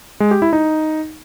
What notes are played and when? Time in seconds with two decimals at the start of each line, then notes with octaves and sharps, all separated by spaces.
0.20 G#3
0.31 G4
0.42 E4
0.53 D#4